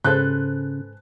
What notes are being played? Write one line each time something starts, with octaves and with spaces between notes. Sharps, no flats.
G#2 C#3 A4 B4 C5 F#6